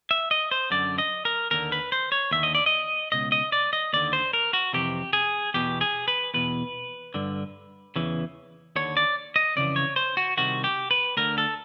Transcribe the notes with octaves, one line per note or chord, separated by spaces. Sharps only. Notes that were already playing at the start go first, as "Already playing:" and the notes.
E5
D#5
C5
F#2 D3 D5
D#5
A#4
D#2 D3 A#4
B4
C5
C#5
D#2 D3 E5
D#5
D5
D#5
C#2 B2 D#5
D#5
D5
D#5
D#2 D3 D5
C5
A#4
F#4
F2 C3 E3 G4
G#4
E2 B2 G4
G#4
B4
E2 B2 B4
G2 D3
E2 C#3 E3
D#2 D3 C#5
D5
D#5
F2 C#3 E3 D5
C#5
C5
F#4
C2 C3 D#3 F#4
G4
B4
D2 D3 A#4
A4